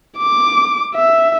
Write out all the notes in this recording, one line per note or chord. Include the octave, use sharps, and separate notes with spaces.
D6
E5